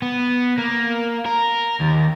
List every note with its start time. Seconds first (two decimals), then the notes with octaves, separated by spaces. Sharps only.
0.02 B3
0.58 A#3
1.26 A#4
1.81 D#2